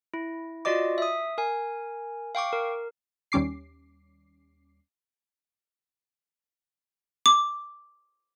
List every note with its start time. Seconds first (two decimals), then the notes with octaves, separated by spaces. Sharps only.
0.14 E4
0.65 F4 F#4 D5 D#5 D6
0.98 E5 D#6
1.38 A#4 G#5
2.35 F5 G5 C#6 D6
2.53 A#4
3.32 D#2 G3 C#4 D6 C7
7.26 D6